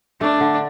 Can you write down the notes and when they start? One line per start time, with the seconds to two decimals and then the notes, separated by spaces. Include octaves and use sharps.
0.21 A3 D4
0.40 D3